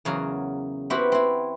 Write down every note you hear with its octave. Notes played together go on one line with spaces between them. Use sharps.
E2 C#3 F#3 A#4
B3 C4 E4 F#4 G4 B4
C4 E4